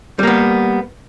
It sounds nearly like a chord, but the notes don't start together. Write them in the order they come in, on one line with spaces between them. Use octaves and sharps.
G3 A#3 B3